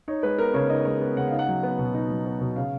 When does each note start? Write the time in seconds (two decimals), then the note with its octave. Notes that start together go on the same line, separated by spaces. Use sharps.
0.08 D#4 C#5
0.23 G#3 B4
0.38 B3 A#4
0.54 C#3 C#5
0.69 D#4 D#5
0.85 G#3 C#5
1.01 B3
1.16 C#3 F#5
1.28 D#4 F5
1.39 F#5
1.47 F#3
1.63 B3
1.78 B2
1.94 D#4
2.10 F#3
2.25 B3
2.41 B2
2.56 C#3 F5